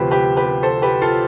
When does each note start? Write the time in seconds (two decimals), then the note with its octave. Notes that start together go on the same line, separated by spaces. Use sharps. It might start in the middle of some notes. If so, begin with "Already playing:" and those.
Already playing: D2 C3 F3 G4 B4 C5
0.11 G4 B4
0.37 G4 B4
0.63 A4 C5
0.82 G4 B4
1.02 F4 A4